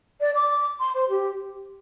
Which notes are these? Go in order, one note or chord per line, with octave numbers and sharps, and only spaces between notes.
D5
D6
C6
C5
G4